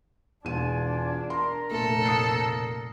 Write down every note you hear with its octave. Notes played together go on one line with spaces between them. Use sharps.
E1 D4 F4 G#5 D#7
A#4 A#5 C6
F1 A#2 A3 A4
D#6 C7 C#7